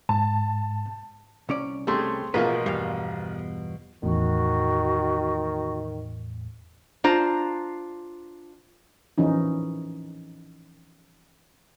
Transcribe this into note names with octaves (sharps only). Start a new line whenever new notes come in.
G#2 A5
C2 C#4 D5
G3 A3 C4 G#4 C#5 C6
A1 B2 F3 A#3 B3 F4 G#4 B4
E2 G2 G3 F5
E2 A2 D#3 F#4
D4 F4 C5 A#5
E3 F3 C#4 D#4